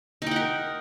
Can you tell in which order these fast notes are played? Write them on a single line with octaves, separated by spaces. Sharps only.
D#4 G5 F#5 A#4